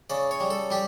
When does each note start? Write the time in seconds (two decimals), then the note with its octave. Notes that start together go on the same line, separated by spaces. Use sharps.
0.10 C#3 D5
0.31 C#5
0.40 G3
0.50 A4
0.71 G3 G4